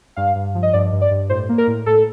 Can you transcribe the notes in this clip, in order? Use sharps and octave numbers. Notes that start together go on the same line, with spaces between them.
G2 F5
G2
F3
D#5
G2 D5
G2
D5
G2
A2 C5
A#3
A#4
A2
A2 A4